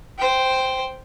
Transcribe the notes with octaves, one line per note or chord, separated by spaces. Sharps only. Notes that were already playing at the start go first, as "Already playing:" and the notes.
C5 G5